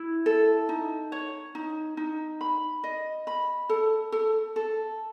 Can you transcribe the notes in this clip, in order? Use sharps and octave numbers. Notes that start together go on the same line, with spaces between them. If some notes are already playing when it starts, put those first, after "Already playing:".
Already playing: E4
A4
D#4
C#5
D#4
D#4
B5
D#5
B5
A4
A4
A4